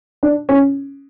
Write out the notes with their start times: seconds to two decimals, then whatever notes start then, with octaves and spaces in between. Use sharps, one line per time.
0.23 D4
0.49 C#4